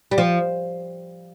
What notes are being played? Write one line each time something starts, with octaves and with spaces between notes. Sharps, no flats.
G3
F3